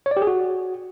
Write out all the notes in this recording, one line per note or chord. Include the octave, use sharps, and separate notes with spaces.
C#5
D5
G4
G#4
F#4